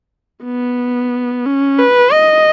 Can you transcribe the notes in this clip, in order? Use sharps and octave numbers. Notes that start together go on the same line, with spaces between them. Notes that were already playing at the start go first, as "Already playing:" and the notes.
B3
C#4
B4
D#5